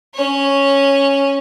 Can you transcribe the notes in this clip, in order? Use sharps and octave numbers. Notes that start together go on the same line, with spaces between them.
C#4 C#5